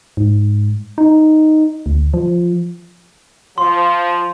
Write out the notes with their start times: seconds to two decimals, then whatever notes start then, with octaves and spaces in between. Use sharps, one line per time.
0.17 G#2
0.98 D#4
1.86 D2
2.14 F3
3.58 F3 C6